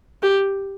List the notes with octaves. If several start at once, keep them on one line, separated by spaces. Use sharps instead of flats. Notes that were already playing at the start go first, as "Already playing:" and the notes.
G4